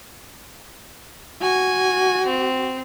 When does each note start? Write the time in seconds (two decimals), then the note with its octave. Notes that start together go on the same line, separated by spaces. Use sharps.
1.41 F#4 G#5
2.26 C4